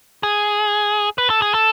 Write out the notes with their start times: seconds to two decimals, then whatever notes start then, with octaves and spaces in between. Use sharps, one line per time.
0.23 G#4
1.18 B4
1.30 A4
1.42 G#4
1.54 A4